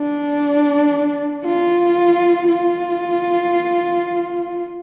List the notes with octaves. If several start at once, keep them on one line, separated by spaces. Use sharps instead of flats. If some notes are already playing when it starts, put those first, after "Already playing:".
Already playing: D4
F4
F4